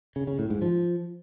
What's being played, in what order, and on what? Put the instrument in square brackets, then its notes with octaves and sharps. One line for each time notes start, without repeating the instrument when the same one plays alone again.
[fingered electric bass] C#3
C#3
A2
G#2
F3